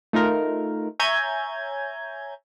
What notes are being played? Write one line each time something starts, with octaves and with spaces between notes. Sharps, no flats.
A3 D#4 F4 A#4
C#5 E5 G#5 A#5 G6 G#6